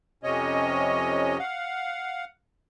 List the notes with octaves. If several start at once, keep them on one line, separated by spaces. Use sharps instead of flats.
F2 C3 C#4 C#5 D#5
F5 F#5